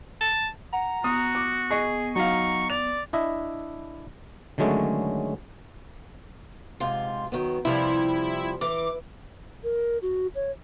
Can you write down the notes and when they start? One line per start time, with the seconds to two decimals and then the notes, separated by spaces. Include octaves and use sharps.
0.21 A5
0.73 F#5 A#5
1.04 B3 F#4 D#6
1.35 D6
1.71 G#4 D#5 C#6
2.16 F#3 D#4 F5 C#6
2.70 D5 F7
3.13 D4 E4 D#5 E5
4.58 D3 D#3 F#3 G#3 A3 C#4
6.80 G#2 C3 F4
7.32 D#3 F#3 B3
7.65 C3 F3 G3 E4
8.61 E3 D6
9.64 A#4
10.02 F#4
10.35 C#5